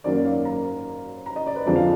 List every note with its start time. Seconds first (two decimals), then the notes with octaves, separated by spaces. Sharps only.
0.04 F#2 D#3 F#3 A#3 D5
0.25 F5
0.45 A#5
1.26 A#5
1.36 D#5
1.46 D5
1.56 B4
1.66 F2 D3 F3 G#3 D5
1.76 F5